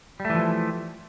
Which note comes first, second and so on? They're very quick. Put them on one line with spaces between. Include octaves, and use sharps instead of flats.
G3 A3 E3 F3